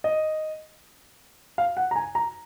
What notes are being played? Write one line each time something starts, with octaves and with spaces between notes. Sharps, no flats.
D#5
F5
F#5
A#5
G#5
A#5